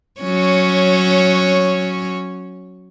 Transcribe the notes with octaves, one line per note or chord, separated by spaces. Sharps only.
F#3 C#4 C#5